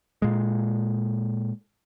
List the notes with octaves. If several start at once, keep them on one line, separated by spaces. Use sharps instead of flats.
A#2 G#3